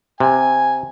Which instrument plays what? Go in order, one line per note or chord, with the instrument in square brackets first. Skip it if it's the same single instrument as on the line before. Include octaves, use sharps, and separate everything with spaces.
[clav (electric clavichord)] C3 [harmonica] G#5